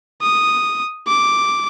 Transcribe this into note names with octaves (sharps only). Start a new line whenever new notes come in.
D#6
D6